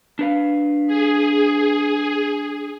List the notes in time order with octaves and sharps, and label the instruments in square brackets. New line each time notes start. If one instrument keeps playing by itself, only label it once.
[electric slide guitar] D4 B4 F5
[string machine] G#4